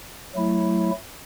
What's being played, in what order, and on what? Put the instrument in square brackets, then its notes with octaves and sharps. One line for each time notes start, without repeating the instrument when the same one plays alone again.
[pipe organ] F#3 A3 E4